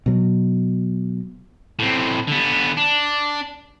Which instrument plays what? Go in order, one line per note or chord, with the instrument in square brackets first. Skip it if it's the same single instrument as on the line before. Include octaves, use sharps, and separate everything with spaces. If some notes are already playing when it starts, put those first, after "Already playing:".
[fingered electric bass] B2 F#3
[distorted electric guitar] A2 C4
D3 B3
D4